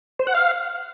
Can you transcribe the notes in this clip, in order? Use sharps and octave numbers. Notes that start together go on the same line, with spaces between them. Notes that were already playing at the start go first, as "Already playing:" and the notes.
C5
F#5
F5